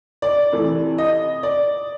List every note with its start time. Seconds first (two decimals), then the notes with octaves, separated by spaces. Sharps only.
0.22 D5
0.52 C3 E3 A3
0.98 D#5
1.43 D5